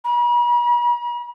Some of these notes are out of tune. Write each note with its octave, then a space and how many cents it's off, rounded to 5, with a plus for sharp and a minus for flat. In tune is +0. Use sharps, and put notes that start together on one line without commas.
B5 -45